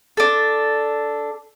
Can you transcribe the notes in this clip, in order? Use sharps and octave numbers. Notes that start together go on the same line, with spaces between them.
D4 A4